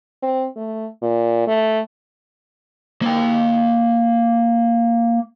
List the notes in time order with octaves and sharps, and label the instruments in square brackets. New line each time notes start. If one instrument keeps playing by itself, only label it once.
[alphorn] C4
A3
A#2
A3
[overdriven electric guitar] A#3 G5